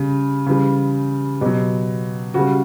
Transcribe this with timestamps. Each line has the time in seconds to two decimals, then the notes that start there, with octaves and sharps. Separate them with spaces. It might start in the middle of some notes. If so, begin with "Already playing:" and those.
Already playing: C#3 G3
0.46 C#3 E3 G3
1.41 B2 F#3 G4
2.34 C#3 G3 F#4